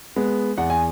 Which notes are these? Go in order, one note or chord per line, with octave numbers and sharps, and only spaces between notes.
G#3 B3
E2 F#5
G#5